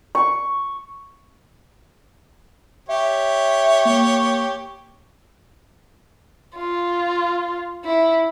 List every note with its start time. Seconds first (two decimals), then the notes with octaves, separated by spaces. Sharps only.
0.15 C#6
2.89 G4 C#5 E5
3.85 A#3
6.56 F4
7.85 E4